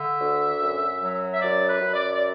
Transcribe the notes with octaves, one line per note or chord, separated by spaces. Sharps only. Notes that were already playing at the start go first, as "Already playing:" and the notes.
Already playing: D3 E5
D2
F#2
F#3
E5
F#2 D5
B4
F#2
D5
D5